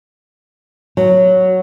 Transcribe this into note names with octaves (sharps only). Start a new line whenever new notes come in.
F#3